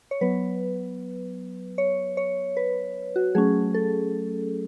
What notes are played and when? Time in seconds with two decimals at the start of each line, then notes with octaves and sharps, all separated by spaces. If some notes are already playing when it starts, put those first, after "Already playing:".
0.11 C#5
0.21 F#3 B3 B4
1.78 C#5
2.17 C#5
2.57 B4
3.16 F#4
3.35 F#3 A3 C#4 G#4
3.74 A4